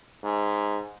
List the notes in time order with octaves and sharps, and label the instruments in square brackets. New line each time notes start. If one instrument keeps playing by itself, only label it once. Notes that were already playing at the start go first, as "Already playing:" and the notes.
[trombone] G#2